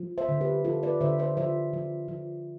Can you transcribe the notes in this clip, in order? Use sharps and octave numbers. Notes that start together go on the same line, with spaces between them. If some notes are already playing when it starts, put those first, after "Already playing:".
Already playing: F3
C5 E5
D3
G4 B4
F3 F4 A4
B4 D5
D3 C5 E5
C5 E5
F3 C5 E5
F3
F3